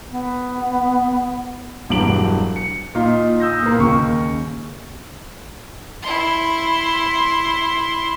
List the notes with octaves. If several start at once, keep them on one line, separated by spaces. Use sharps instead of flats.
B3
E1 G2 F#3 D7 F#7
C#7
A#2 D#4 F4
D#6 E6 G6 A#6
A#2 A#3
D#2 C#3 C#6
E4 C6